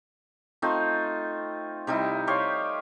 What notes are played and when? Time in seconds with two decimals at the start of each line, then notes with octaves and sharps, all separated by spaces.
0.62 A3 C4 D#4 F4
1.87 C3 G3 D#4 E4
2.27 G4 C5 C#5 F5